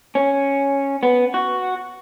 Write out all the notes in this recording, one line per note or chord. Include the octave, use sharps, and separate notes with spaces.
C#4
B3
F#4